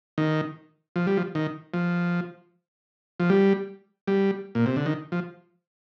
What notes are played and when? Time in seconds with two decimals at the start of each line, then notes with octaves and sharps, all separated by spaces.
0.18 D#3
0.96 F3
1.07 G3
1.17 F3
1.35 D#3
1.74 F3
3.20 F3
3.30 G3
4.08 G3
4.55 A#2
4.66 C3
4.76 D3
4.86 D#3
5.12 F3